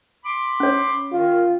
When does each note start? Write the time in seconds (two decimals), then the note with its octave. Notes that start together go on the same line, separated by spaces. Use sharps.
0.24 B5 C6 D6
0.60 C#4 C#5
1.12 D#3 F4